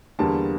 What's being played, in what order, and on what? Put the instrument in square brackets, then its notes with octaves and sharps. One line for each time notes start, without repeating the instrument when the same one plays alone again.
[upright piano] E2 D3 G3 A#3 A5